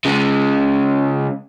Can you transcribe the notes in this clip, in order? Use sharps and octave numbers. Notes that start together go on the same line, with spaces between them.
C#3 G#3